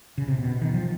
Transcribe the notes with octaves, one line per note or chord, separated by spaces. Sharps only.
C#3
C3
B2
D#3
F3